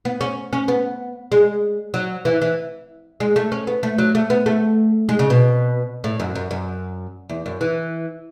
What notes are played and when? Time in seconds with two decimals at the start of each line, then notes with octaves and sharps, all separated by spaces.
0.05 B3
0.21 C#4
0.53 C#4
0.68 B3
1.32 G#3
1.94 F#3
2.25 E3
2.41 E3
3.20 G#3
3.36 A3
3.52 C#4
3.67 B3
3.83 A3
3.98 F#3
4.15 A3
4.30 B3
4.46 A3
5.09 G#3
5.19 C#3
5.30 B2
6.04 A2
6.20 F#2
6.35 F#2
6.51 F#2
7.29 E2
7.46 F#2
7.61 E3